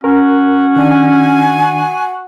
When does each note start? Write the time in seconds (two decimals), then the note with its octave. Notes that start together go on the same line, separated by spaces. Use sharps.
0.04 C#4 F#4 A#4
0.76 D#3 D4 G#5